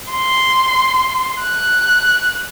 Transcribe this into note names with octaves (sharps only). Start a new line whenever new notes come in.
C6
F#6